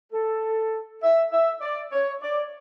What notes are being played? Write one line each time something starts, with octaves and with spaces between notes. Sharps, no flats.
A4
E5
E5
D5
C#5
D5